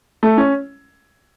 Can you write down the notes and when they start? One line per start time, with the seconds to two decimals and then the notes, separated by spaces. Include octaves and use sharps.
0.23 A3
0.38 C#4